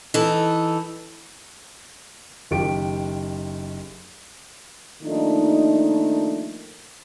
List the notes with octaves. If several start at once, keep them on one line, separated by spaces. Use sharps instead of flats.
E3 D#4 A4
F#1 D#3 G4 D7
D#3 F3 A3 A#3 D4 D#4